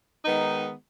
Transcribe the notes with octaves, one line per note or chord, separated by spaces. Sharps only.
D#3 G#3 B3 D#4